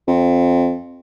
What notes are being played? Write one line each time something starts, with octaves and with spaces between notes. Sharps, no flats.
F2